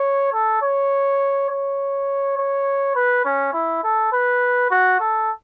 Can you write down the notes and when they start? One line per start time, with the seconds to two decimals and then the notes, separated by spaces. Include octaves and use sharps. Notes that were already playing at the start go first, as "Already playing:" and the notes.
Already playing: C#5
0.33 A4
0.62 C#5
1.49 C#5
2.38 C#5
2.95 B4
3.25 C#4
3.54 E4
3.84 A4
4.12 B4
4.71 F#4
5.00 A4